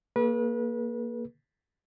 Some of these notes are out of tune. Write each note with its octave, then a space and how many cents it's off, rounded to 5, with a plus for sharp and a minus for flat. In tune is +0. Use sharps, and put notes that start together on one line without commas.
A#3 +0 G#4 +45 B4 -35